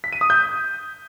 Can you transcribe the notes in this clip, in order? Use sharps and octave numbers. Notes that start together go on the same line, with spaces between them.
B6
D#7
D#6
G6